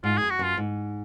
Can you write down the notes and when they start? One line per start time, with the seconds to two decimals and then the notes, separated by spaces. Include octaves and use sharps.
0.04 G#2 F4
0.17 F#2 G#4
0.30 F#4
0.39 F#2
0.44 F4
0.57 G#2